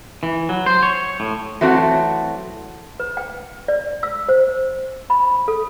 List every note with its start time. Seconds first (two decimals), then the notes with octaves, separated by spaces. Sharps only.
0.23 E3
0.49 F#3
0.66 C5
0.83 C#5
1.20 A2
1.61 E3 F#3 A3 C4 F#4
3.00 B4
3.17 G5
3.68 D5
4.03 E6
4.29 C5
5.10 B5
5.48 A4